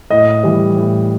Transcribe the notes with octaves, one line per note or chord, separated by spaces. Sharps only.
A2 D#5
E3 G3
A2